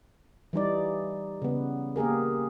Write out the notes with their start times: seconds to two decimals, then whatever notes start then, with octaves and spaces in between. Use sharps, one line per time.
0.53 E3 G3 D#4 D5
1.42 C#3 B3
1.96 A#3 G4 G#4 A#4